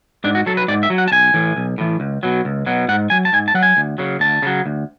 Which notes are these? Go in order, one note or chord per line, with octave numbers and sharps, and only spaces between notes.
G#2 D4
F#4
F#3 A4
B4
G#2 D5
E5
F#3
F#5
A5
B1 G#5
A2 E3
B1
A2 E3
C#2
B2 F#3
C#2
B2 F#3
G#2 F#5
F#3 G#5
A5
G#2 G#5
A5
F#3 F#5
G#5
D2
C#3 F#3
D2 A5
C#3 F#3
D2